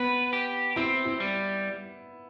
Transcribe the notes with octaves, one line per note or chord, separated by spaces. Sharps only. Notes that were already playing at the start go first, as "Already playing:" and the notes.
Already playing: B3 B4
G4
C4 E4
E4
G3